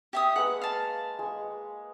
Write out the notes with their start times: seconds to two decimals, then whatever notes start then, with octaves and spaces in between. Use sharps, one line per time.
0.13 G4 E5 D#6
0.36 G#3 A#3 B4 F#5
0.61 F5 A5
1.19 G#3 C#6